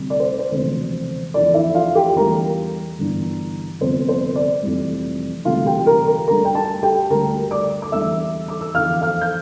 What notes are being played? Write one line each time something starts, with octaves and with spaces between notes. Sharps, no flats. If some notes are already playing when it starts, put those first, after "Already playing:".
Already playing: D2 C3 G3
D5
C5
C5
E1 D2 C3 F3
E2 D3 F3 D5
E4 E5
F4 F5
G4 G5
E2 D3 G3 A#4 A#5
G1 G2 E3
G1 F2 C3 C5
C5
D5
F1 F2 C3 E3 G3
E1 D2 C3 G3 F4 F5
G4 G5
A#4 A#5
A#4 A#5
D2 D3 G3 A#4 A#5
G5
A4 A5
G4 G5
D2 D3 G3 A#4 A#5
D5 D6
D6
E2 D3 G3 E5 E6
D6
E6
E2 D3 F3 F5 F6
F5 F6
G6